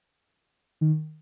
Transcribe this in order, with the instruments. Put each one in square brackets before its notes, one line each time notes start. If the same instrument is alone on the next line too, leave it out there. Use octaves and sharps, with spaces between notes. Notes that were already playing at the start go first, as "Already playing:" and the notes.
[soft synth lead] D#3